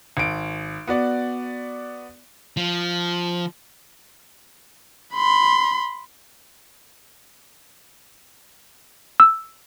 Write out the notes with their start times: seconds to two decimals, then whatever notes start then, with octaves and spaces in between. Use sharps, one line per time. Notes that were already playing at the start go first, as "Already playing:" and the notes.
0.17 G#1 D7
0.87 B3 F#4 D5
2.57 F3
5.14 B5 C6
9.20 E6